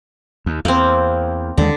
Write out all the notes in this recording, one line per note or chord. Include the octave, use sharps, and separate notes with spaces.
D#2
E2 A#3 C4
D#2 D3 G#3